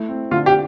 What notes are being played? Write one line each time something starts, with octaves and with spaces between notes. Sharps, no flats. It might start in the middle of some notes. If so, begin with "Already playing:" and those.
Already playing: A3 E4
C4
D3 F4
G4